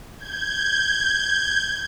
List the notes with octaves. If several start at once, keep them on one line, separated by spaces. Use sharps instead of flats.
G6 G#6